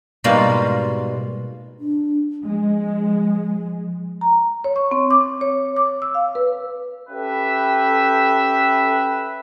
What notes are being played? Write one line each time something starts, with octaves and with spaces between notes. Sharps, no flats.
G#2 B2 G3 G#3 A#3 F4
D4
F3 G#3
A#5
C#5
C#6
C4
D6
C#5
D6
E6
F5
B4
C#4 G4 A4 B4 E5 G5